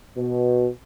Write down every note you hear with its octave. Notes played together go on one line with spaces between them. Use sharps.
B2